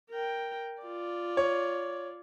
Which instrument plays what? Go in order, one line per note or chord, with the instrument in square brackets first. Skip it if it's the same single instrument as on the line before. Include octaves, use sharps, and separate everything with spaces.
[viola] A#4 G5
F4 D5
[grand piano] C#5